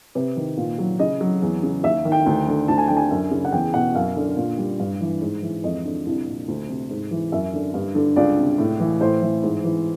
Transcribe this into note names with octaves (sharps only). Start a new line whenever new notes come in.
C3 B4
D#3
A#2
F#3
C#3 D#5
F#3
E2
C#3
D#2 E5
D#3
G5
D2
D3
D2 A5
G#5
D3 G5
G#5
F#2
C#3
F#5
E2 G5
B2 F#5
F#2 F5
D3
A#2
G3
G2
E3
G#2
E3
F2 D#5
D3
C2
A#2
D2
C3
G#2
E3
F#2 E5
D3
G2
D3
C#2 D5
C3
A2
E3
A2 C5
E3
G#2
E3